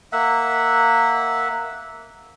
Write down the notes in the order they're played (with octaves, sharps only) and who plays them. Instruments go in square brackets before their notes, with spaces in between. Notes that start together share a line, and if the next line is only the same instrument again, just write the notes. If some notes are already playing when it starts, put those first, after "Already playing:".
[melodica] A#3 E5 F#5